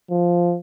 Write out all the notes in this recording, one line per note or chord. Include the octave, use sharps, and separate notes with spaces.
F3